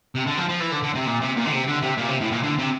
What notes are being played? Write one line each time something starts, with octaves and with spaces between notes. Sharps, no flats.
C3
D3
F3
F3
E3
D3
D3
C3
A#2
C3
A#2
D3
C3
D3
C3
A#2
C3
A2
A#2
D3
C3